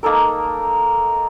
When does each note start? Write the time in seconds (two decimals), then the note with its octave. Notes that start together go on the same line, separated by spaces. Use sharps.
0.03 A#3 D#4 A4 A#4